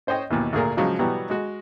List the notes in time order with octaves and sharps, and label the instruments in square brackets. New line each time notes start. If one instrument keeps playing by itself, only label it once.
[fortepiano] C#4 C5 C#5 D#5 G5
D#2 B2 E3
D2 A#2 A#3 G#4 A#4
C#3 F3 F#3 G#3
B2 E3 F#3 G3 B3
G#3 F#4